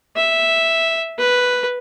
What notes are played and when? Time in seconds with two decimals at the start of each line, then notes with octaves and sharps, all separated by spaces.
0.17 E5
1.18 B4